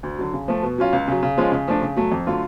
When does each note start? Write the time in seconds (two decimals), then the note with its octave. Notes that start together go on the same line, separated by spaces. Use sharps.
0.03 D2
0.18 D3 F#3
0.33 C#3
0.48 F3 A3
0.63 B2
0.78 F#3 C#4 F4
0.93 C#2
1.08 C#3 F#3
1.23 C#3
1.37 F3 G#3 C#4 F4
1.52 C#3
1.68 F3 A3 D4
1.82 C#3
1.97 F#3 A3
2.12 F2
2.27 D3 F#3 A3 F4